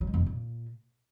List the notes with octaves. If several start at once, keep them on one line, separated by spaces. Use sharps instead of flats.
F#3
G#3
F2
C3
A#2